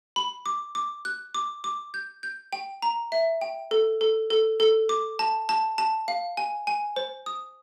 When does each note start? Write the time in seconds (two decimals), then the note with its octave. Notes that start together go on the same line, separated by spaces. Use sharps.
0.16 B5
0.46 D6
0.75 D6
1.05 F#6
1.35 D6
1.64 D6
1.94 G6
2.23 G6
2.53 G5
2.82 A#5
3.12 E5
3.41 G5
3.71 A4
4.01 A4
4.30 A4
4.60 A4
4.89 D6
5.19 A5
5.49 A5
5.78 A5
6.08 F5
6.37 G#5
6.67 G#5
6.96 C5
7.26 D#6